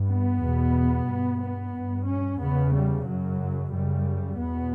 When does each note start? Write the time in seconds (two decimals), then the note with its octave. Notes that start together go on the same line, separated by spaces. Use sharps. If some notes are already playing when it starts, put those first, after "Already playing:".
Already playing: G2
0.10 B3
0.42 E2 B2
1.08 G2
1.42 B3
1.75 G2
2.08 C#4
2.41 E2 C#3 B3
2.74 G3
3.07 F#2 C#3 F#3
3.74 F#2 C#3 G3
4.40 E2 B2 B3